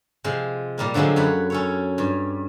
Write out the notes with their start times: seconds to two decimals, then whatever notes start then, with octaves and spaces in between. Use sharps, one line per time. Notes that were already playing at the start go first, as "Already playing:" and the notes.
0.24 C3 F3 G#3
0.78 A#2 G3 A#3
0.94 D3 F3 F#3 G#3 C4
1.16 F#2 C#5 F#5 B5
1.50 C#4 A4 C#5
1.98 G2